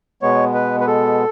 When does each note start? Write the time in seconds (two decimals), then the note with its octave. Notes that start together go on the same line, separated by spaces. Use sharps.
0.22 B2 G#3 B3 C#5
0.54 B4
0.81 B4
0.87 A4